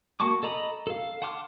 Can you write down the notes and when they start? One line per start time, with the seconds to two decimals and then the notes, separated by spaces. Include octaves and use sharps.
0.20 A#3 F#4 A5 C#6 D6
0.43 A4 D#5 A#5 B5 D#6
0.87 A4 F5
1.22 F#5 A5 C6 D6 F6